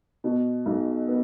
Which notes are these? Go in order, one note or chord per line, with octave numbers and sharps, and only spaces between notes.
B2
B1
B3